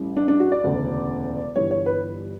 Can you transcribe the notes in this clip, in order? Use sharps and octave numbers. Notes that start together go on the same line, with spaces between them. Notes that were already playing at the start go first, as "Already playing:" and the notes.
Already playing: A1 A2 G3
D4
D4
F#4
D5
E1 D2 C#3
G1 G2 E3 G3 C#5
C#5
B4